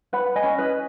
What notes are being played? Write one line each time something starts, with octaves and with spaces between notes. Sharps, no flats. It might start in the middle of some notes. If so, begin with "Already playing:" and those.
B4 F#5 B5
D#5 G#5
C#4
B4 D#5